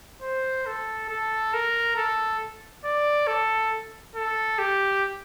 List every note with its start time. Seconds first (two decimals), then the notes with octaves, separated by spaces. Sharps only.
0.21 C5
0.66 A4
1.09 A4
1.54 A#4
1.96 A4
2.84 D5
3.27 A4
4.15 A4
4.58 G4